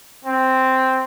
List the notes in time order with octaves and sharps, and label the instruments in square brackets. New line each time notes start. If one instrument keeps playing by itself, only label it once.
[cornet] C4